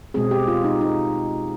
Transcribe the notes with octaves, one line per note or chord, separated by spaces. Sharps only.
B2 G#3 C4 G#4
G4
F4
D#4
D#4